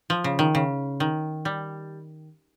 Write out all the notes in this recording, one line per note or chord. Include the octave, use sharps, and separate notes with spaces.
F3
C#3
D#3
C#3
D#3
G3